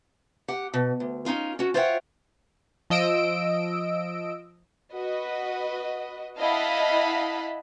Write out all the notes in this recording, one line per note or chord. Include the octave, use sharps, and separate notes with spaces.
G4 F#5
B2
D2
C#4 D#4 F4 A#4
C#4 F#4
F4 C5 C#5 E5 F#5 G5
F3 D#5 E6 D7
F#4 B4 D#5
E4 D#5 F5 F#5 A5 B5